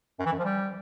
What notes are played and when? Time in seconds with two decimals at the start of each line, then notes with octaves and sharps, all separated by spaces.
0.19 F#2
0.26 E3
0.32 F#2
0.38 F3
0.45 G3